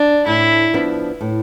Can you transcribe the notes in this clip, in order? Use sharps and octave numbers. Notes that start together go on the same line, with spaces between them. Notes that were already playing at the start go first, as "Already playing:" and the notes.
Already playing: D4
A2 E4
F3 B3 D4
A2